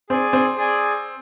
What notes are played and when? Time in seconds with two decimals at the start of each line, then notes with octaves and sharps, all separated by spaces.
0.10 C4 G#4 D5 G#5
0.33 C4
0.57 G#4 D5 G#5